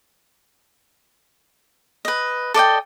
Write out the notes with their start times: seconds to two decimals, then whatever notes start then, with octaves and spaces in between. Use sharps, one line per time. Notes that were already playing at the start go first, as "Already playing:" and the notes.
2.05 B4 D#5
2.54 A4 D5 D#5 G5